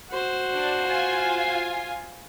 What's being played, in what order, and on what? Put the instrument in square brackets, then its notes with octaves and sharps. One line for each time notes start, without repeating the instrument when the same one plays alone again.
[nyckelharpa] F#4 C5
[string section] D4
F4 G#5